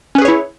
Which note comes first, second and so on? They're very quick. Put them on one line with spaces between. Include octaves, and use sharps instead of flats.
C#4 B4 G#4 C#5 E4